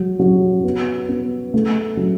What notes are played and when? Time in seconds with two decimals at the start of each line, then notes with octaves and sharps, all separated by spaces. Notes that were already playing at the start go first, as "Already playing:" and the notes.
Already playing: F#3
0.19 F#3
0.64 B3
1.09 B3
1.54 A3
1.97 F#3